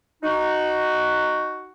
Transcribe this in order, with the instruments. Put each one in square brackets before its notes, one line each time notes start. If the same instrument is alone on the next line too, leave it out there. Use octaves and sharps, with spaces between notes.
[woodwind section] D#4 F#4